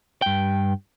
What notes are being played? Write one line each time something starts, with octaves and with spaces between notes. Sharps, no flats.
G2 G5